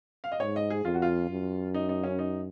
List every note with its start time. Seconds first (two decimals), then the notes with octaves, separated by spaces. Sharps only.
0.24 F5
0.32 D#5
0.40 G#2 C#5
0.56 D#5
0.70 G#4
0.84 F2 F4
0.94 F#4
1.02 F4
1.30 F#2
1.74 D#4
1.89 D#4
2.04 C#4
2.19 D#4